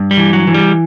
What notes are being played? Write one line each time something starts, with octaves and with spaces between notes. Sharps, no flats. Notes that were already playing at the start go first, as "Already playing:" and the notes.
Already playing: G2
G3
E3
F#3
E3
G3